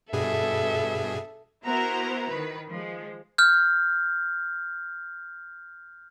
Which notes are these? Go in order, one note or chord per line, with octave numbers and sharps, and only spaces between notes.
G2 B2 G#4 A4 E5
B3 E4 F#4 A#4 C5 A#5
D#3 B4
F3 G#3
F6 G6